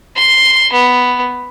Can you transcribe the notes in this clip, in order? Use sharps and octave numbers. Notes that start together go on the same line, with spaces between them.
C6
B3